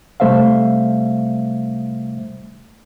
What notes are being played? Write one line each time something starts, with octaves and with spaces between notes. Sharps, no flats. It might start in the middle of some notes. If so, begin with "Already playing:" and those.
C3 G3 A3 C5 E5 F5